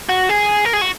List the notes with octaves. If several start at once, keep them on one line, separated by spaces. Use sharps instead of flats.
F#4
G#4
A#4
G#4
F#4